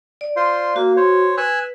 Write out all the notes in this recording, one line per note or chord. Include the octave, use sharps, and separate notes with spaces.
D5
F4 C5 C6
A#3 F#4
C5 C#5
B4 G#5 E6 F#6